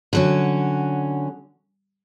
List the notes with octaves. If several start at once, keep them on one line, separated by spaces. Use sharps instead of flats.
D3 F#3 C#4